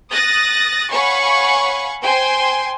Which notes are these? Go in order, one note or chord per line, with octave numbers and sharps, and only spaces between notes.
D#6 F#6 A6 A#6
C#5 F5 F#5 G#5 B5 C#6
C5 G5 G#5 C6